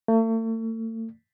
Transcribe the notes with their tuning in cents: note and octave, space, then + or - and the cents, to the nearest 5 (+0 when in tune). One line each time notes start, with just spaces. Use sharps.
A3 +40